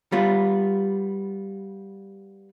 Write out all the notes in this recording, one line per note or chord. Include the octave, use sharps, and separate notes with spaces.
G3 B3 F4